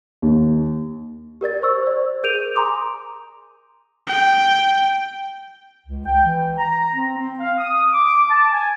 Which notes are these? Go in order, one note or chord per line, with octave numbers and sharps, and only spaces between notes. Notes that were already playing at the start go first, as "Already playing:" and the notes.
D#2
G4 A#4 D5 A6
C5 C#6 E6
C5 D5
G#4 A#4 G6 D7 D#7 F7
G#5 A#5 C6 D6 D#6
G5
C#2
G5
E3
A#5
C4
C4
F5
D#6
D6
A5
G#5